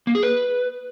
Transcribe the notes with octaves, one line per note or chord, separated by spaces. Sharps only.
A#3
G#4
B4